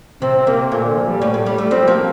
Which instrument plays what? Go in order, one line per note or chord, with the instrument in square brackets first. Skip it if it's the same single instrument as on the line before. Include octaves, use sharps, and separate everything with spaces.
[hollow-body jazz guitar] C3 [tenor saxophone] C4
[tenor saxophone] C4
[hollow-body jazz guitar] C3 [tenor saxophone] A#3
[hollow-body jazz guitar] A#2 [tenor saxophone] A3
[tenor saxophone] D3
F3
G3
[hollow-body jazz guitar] A2 [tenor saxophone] G3
[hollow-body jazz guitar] A2 [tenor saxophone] A3
[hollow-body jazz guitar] G3
[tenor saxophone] G3 [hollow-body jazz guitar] A3
[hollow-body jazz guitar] F3 [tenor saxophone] C4
[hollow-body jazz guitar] F3 [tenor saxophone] A#3